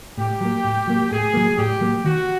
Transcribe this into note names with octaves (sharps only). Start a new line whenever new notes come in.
A2 G4
F#3 A#3
A2
F#3 A#3
A2 G#4
F#3 A#3
A2 G4
F#3 A#3
D#3 F#4